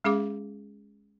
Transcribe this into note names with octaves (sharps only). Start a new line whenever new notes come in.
G#3 C#4 G#4 F5 D6